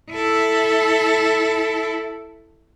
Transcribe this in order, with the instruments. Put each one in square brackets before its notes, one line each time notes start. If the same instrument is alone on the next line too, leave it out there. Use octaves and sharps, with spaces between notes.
[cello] E4 A4